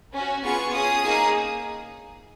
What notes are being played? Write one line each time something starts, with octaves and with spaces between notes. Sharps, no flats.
C#4 F#4
B3 F4 G#4 C#6
C#4 G#4 D#6
A#3 D#4 G#4